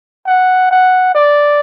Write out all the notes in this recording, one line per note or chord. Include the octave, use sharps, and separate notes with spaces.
F#5
F#5
D5